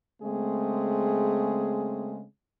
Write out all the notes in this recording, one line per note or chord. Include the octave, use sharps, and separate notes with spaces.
C#3 G#3 A3 C4 G#4